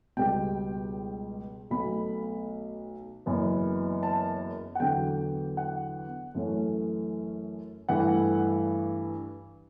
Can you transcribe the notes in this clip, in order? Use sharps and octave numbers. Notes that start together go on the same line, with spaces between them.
C#2 B2 G3 G5
B1 B2 A3 B5
F#1 F#2 E3 B3
A5
F#5
E2 D3 F#3 G5
F#5
F#2 E3 A3 C#4
G2 E3 A3 F#5